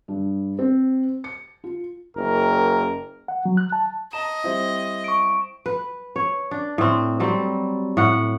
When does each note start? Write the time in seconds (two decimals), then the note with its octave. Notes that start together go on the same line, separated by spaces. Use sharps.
0.08 G2
0.59 C4
1.24 C#7
1.64 F4
2.17 F#1 A#4
3.28 F#5
3.45 F#3
3.57 F#6
3.72 A5
4.13 D#5 A5 A#5 E7
4.44 G3 C4 E4
5.04 C#6 D7
5.66 B4
6.16 C#5
6.51 D4
6.78 A2 C4
7.20 F#3 G3 C4
7.97 A2 F#5